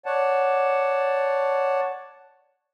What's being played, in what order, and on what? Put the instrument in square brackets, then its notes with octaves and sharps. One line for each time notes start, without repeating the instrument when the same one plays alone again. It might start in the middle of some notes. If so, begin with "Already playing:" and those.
[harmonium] C#5 D5 F#5 A5